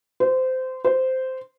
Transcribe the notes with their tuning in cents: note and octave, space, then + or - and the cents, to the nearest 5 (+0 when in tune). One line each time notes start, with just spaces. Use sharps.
C5 -20
C5 -10